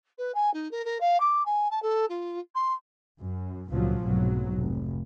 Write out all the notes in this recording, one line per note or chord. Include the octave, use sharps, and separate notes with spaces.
B4
G#5
D#4
A#4
A#4
F5
D6
G#5
A5
A4
F4
C6
F#2
G#1 C#2 A#2 F3 F#3
F1 B1 G#2 F#3
F1